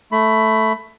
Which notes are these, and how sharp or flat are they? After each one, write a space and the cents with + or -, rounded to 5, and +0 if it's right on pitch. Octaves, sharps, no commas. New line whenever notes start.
A3 +0 B5 +15